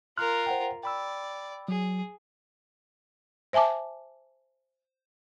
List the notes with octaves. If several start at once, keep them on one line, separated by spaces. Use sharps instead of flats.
F4 A#4 C6 F6 F#6
C5 F#5 G5
D5 G5 B5 E6
F#3 G#4
C5 E5 G#5 A5 D6